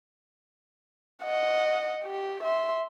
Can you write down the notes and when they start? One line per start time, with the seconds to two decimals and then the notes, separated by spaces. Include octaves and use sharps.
1.23 D#5 F#5
2.04 G4
2.44 E5 C6